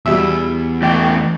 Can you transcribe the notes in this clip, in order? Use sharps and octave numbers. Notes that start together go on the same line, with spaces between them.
E2 B2 G3 E5
A2 E3 G5